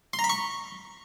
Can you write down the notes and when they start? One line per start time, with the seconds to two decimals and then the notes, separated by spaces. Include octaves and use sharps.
0.13 C6
0.19 A#5
0.24 B5
0.29 C#6